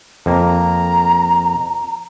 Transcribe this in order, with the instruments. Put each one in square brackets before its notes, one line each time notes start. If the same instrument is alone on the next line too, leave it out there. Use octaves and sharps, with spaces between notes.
[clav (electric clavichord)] F2 A#3 [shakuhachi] A#5